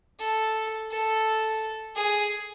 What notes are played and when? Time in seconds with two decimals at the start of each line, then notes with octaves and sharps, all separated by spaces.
0.19 A4
0.91 A4
1.96 G#4